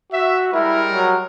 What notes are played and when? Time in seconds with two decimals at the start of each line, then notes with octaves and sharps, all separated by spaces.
0.13 F#4 E5
0.53 G3 G#3 E4 A#4
0.93 F#3